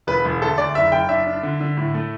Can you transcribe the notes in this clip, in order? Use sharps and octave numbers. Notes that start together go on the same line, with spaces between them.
E1 B4
E1
D2 A4
D2 D5
F#1 E5
F#1 G5
D4 E5
D4
D3
D3
A2
A3